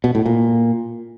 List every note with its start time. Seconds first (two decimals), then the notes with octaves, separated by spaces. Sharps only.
0.04 B2
0.15 A2
0.26 A#2